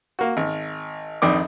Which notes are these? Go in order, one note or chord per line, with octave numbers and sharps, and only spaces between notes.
A#3 F#4
G#1
A#1 F2 D#3 D5 D#5 D6